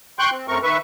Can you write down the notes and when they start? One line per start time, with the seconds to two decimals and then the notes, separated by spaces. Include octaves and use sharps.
0.19 G5 C6 C#6 F#6 G6
0.31 C4
0.48 F#2 A3 C4 A#4 C#6
0.63 D#3 B4 E5 C#6